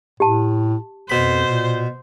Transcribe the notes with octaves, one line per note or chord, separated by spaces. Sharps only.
A2 G4 A5
F2 B2 C5 B5
A#2